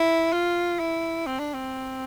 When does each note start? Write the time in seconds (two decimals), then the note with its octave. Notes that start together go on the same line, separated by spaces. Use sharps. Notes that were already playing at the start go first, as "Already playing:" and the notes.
Already playing: E4
0.32 F4
0.79 E4
1.26 C4
1.39 D4
1.54 C4